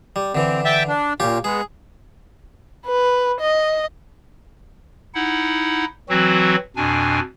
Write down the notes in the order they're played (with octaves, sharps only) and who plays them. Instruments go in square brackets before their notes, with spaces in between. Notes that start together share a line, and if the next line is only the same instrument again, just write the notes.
[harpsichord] G3
[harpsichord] D3 E3 [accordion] C4
[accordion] E5 G5 A5
D4
[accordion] A#2 [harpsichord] C#4 F4 G4
[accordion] G#3 B3 [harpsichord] G#4
[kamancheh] B4
D#5
[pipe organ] D#4 E4 F#5
E3 F#3 C4 F#4
F2 B2 D4 G#5